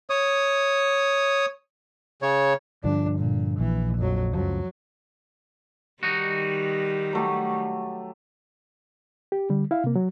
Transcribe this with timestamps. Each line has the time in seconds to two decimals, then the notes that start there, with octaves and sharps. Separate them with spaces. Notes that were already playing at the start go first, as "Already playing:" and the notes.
0.10 C#5 D#6
2.22 C#3 C#5
2.84 G2 D3 F3 D4
3.19 A#2
3.60 A#1 E3
3.98 F2 F#3
4.33 C#2 F#2 F3 F#3
6.03 D#3 G3 D#4 F#4
7.13 F#3 A3 G4
9.32 G4
9.50 D3 G3
9.71 E4 F5
9.84 C3 A#3
9.96 F#3